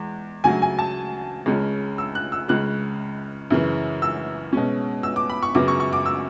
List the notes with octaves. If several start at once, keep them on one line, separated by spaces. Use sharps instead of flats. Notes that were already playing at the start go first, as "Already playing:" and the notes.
Already playing: E2 G#3
D2 C#3 F#3 A3 G#5
G#5
A5
C#2 C#3 G#3 C#4
E6
F#6
E6
C#2 C#3 G#3 F#6
F#2 C#3 E3
E6
B2 G#3 C#4
E6
D6
B5
C#6
F#2 C#3 F#3 B3 D6
C#6
C#6
D6
E6